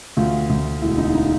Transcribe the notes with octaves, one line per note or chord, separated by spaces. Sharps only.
D2 F4
D2
E1 E4
D#4
D#4